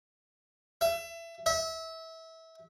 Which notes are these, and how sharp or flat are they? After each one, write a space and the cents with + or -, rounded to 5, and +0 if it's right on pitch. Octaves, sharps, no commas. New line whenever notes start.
E5 +25
E5 -25